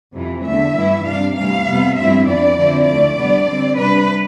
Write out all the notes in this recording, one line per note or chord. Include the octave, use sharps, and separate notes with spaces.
F2 C3 E3
E2 D3 A3 E5
G2 E3 B3 E4
C3 G3 D4 F5
D2 C3 E3 G3 F5
F2 C3 G3 B3
G2 F3 A3 C4 E4 E5
F2 E3 B3 D4 D5
D3 F3 C4 E4
D2 D3 A3 D5
C3 G3 B3 D4
D3 G3 C4
C3 G3 D4 B4